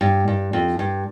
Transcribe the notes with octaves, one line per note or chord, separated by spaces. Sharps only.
G2
G2
F2
G2